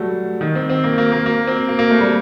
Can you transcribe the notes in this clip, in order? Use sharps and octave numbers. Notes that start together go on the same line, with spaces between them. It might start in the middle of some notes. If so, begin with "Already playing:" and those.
Already playing: F#3 G3 A3
D#3
C4
C4
A#3
A#3
A#3
A#3
C4
A#3
A#3
A3
G3